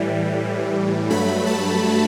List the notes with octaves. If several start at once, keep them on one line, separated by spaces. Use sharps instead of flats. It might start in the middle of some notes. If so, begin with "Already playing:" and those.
Already playing: A2 E3 G3
G2 F#3 A3 B5
A5